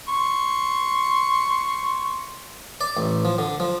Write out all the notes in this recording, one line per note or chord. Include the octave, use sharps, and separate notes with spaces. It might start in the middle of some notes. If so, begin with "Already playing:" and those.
C6 C#6
D5
A1
F3
D3
F3